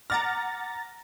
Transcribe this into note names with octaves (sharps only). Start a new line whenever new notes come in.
F#5 A#5 D6 F6 A6 A#6